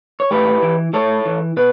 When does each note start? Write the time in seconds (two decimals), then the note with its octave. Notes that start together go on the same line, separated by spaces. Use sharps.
0.20 C#5
0.31 A2 G4 B4
0.62 E3
0.93 A2 A4 C#5
1.26 E3
1.57 B2 B4